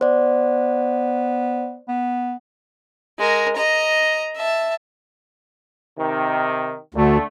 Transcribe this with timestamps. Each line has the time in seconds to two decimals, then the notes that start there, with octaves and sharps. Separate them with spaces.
0.01 B3 C5 D5
1.88 B3
3.19 G#3 A#4
3.56 D#5 A#5
4.36 E5 A5
5.97 C3 D#3
6.94 D2 D3 A3